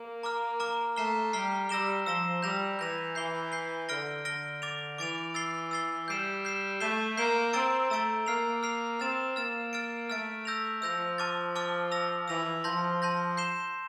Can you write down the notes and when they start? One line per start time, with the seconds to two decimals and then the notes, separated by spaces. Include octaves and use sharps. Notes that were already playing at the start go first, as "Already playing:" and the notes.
Already playing: A#3
0.23 A#5 D6 F6
0.60 A#5 D6 F6
0.96 A3 A#5 F6 C7 G7
1.33 G3 A#5 F6 C7 G7
1.69 G3 E6 A#6 E7 G7
2.06 F3 E6 A#6 E7 G7
2.42 G3 G6 A#6 F7
2.79 E3 G6 A#6 F7
3.15 E3 G6 C7 G7
3.52 G6 C7 G7
3.89 D3 F6 A#6 D7 G7
4.25 D3 F6 A#6 D7 G7
4.62 D6 A6 D7 F7
4.98 E3 D6 A6 D7 F7
5.34 E6 A6 C7 G7
5.71 E6 A6 C7 G7
6.07 G3 G6 C7 E7
6.45 G6 C7 E7
6.80 A3 G6 C7 E7 G7
7.17 A#3 G6 C7 E7 G7
7.53 C4 A#5 E6 A6 D7 G7
7.90 A3 A#5 E6 A6 D7 G7
8.26 A#3 F6 C7 F7
8.63 F6 C7 F7
9.00 C4 F6 A6 E7
9.36 A#3 F6 A6 E7
9.73 F6 A6 D7
10.09 A3 F6 A6 D7
10.45 E6 G6 A#6 F7
10.82 F3 E6 G6 A#6 F7
11.18 A5 D6 F6 A6
11.55 A5 D6 F6 A6
11.92 E6 A#6 F7
12.28 E3 E6 A#6 F7
12.64 F3 A5 C6 G6 A#6
13.02 A5 C6 G6 A#6
13.37 G6 C7 E7 G7